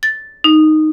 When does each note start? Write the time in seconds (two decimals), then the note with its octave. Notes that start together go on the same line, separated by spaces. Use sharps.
0.03 A6
0.44 D#4